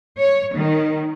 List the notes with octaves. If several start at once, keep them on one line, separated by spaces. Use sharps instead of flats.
C#5
D#3